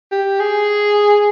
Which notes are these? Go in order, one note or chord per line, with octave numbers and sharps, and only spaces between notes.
G4
G#4